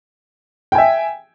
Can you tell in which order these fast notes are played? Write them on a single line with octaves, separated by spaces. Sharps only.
G5 G#5 E5